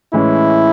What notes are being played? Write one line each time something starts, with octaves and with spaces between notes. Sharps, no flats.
A2 E3 G#3 C#4 E4